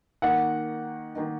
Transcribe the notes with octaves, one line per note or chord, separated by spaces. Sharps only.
D#3 A#3 D#4 F#5
D#3 A#3 D#4